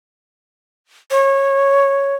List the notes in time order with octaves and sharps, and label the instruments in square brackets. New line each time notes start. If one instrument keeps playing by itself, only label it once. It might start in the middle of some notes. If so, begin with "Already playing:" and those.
[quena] C#5